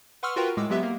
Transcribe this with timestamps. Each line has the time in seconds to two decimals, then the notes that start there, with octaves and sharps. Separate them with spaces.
0.23 B4 F#5 C6 C#6 E6 F6
0.36 F4 F#4 A#4 B4 G5
0.57 A2 G#3 D6 E6
0.70 F#3 G#3 B3 G4 E5
0.83 A#3